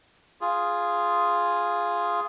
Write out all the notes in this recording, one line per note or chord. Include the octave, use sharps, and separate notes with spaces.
F4 G#4